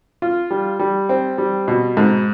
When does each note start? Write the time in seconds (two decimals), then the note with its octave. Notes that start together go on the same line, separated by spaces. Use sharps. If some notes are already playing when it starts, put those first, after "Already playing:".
0.22 F4
0.51 G3
0.79 G3
1.09 C4
1.38 G3
1.68 B2
1.97 G#2